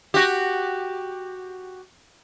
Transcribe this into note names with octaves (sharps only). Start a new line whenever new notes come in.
F#4 G4